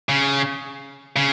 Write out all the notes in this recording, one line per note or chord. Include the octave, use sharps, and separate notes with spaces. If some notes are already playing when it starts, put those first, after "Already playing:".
C#3
C#3